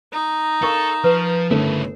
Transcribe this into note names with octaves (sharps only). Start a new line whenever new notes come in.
D#4 A#5
A4 A#4 F5 C#6
F3 B4
G1 C#3 A3 E4 A4 A#4 C#5